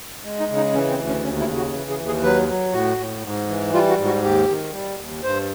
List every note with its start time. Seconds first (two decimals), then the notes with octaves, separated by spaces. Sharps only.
0.24 G#3
0.40 D#4
0.49 C#3
0.56 D#4
0.73 E3 C#4
0.90 C4
0.98 D2
1.07 C#4
1.24 D#2 C#4
1.40 E4
1.49 C#3
1.57 F#4
1.73 E3
1.90 G#4
1.99 D#2
2.07 G#4
2.23 F#3 B4
2.48 F#3
2.73 A2 F#4
2.98 A2
3.23 G#2
3.49 E3
3.73 G3 F4
3.90 F#4
3.98 G#2
4.06 F#4
4.22 D#2 G4
4.48 D#3
4.73 G3
4.98 D#2
5.23 G2 C5